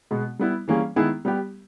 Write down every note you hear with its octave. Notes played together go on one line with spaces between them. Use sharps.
B2 G#3 B3
G3 B3 E4
E3 G3 A#3 C#4 G#4
D#3 G#3 B3 E4 G#4
G3 B3 G4